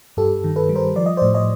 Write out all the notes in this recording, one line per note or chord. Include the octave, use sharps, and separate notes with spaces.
G2 G4 A4
D#3
A4 B4
G3
A#4 C5
F3 D5
D#5
A2 C5 D5
C#5 D#5